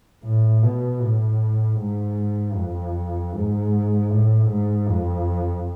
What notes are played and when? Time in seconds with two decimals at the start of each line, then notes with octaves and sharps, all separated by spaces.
0.24 A2
0.63 B2
1.01 A2
1.78 G#2
2.56 F2
3.34 G#2
4.10 A2
4.49 G#2
4.88 F2